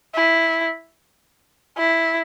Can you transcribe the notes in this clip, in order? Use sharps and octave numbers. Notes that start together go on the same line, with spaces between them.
E4
E4